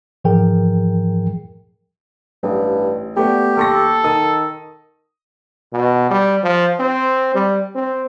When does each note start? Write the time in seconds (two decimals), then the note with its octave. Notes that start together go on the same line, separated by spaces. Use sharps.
0.24 G#2 E3 F3 G#4 A#4 G5
2.43 A1 G2
3.17 A3 B3 G4 D5
3.57 D#2 A4 C#6 A#6
4.04 D#3 D#6
5.73 B2
6.10 G3
6.43 F3
6.79 C4
7.35 G3
7.75 C4